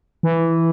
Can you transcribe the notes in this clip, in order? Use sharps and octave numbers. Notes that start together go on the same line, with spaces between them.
E3